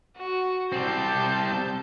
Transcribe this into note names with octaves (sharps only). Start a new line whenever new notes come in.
F#4
G3 C4 A5 G6